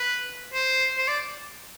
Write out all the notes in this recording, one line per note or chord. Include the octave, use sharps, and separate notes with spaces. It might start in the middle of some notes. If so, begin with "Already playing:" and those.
Already playing: B4
C5
C5
D5